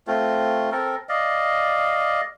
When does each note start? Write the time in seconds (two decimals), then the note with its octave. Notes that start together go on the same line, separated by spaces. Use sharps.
0.07 A3 C4 F4
0.72 C4 A4 A#4
1.09 D5 D#5 F5